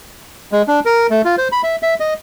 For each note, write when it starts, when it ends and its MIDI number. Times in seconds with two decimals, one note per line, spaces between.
0.52 0.62 56
0.68 0.80 62
0.85 1.07 70
1.10 1.22 57
1.25 1.36 65
1.38 1.48 72
1.52 1.62 83
1.63 1.76 76
1.83 1.94 76
2.00 2.14 75